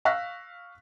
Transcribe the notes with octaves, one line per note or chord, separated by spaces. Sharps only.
F5 C#6 E6 F#6 A#6 B6